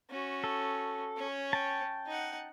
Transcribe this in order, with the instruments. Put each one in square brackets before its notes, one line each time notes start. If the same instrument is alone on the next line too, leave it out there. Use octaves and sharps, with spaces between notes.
[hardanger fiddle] C#4 F#4
[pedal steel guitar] A4
[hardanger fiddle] C#4 C#5
[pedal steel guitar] G5 A5
[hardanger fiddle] D#4 F#5